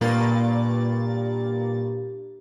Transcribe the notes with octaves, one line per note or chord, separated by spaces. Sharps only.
G2 A#2 A#3 A6